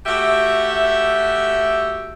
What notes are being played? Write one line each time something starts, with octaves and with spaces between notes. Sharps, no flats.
A3 F#4 G4 E5